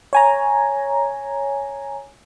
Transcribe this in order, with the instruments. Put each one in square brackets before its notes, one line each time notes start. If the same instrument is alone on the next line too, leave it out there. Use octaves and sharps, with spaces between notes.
[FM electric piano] C#5 G#5 A#5